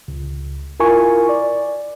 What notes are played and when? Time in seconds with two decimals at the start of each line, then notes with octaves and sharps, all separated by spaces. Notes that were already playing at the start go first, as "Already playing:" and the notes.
0.08 C#2
0.80 E4 F4 A#4 G#5 C#6
1.29 D5